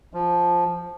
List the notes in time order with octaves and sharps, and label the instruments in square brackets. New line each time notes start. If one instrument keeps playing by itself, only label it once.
[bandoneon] F3